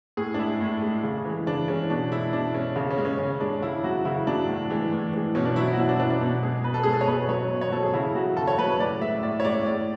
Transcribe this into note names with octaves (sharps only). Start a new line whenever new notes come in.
A2 G#4
D4
G#3 E4
A2
G#3
C#3
E3 G#3
C#3 D4
E3 G#3 C#4
B2 D4
G#3 E4
B2 D4
G#3 C#4
C#3
C#4
G#3
C#4
C#3 C#4
G#3 D4
C#3 E4
F#3 F#4
C#3 E4
F#3 D4
A2
E3 G#3
A2
E3 G#3
B2 C#4
D4
F#3 E4
E4
F#4
B2 E4
D4
F#3 D4
D4
B2
G#3 G#4
B2 B4
A4
G#3 G#4
A4
C#5
B2 B4
F#3 C#5
B2
C#5
F#3 A4
G#4
C#3 E4
F#3 F#4
C#3 A4
C#5
F#3 B4
A2 D5
G#3 E5
A2 D5
C#5
G#3 D5
A2 D5